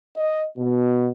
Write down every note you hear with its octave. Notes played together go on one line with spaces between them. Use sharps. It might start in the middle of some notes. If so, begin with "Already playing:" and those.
D#5
B2